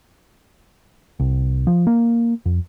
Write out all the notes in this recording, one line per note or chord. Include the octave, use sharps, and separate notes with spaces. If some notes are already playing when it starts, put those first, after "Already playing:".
C2
F3
A#3
F2